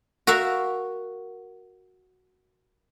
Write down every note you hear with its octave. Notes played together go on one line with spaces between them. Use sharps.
F#4 A#4 E5 F5